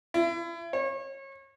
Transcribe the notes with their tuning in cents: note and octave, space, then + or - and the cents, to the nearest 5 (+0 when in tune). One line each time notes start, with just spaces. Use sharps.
E4 +35
C#5 -30